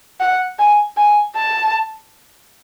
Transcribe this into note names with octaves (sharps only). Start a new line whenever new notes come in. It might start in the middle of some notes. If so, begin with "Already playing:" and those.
F#5
G#5
G#5
A5